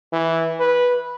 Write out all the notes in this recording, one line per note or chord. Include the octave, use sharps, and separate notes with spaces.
E3
B4